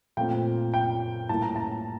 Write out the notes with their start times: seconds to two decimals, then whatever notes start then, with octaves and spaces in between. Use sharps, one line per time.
0.17 A#2 A3 C4 G5
0.74 G5
1.29 A2 G3 A#3 A5
1.42 A#5
1.56 A5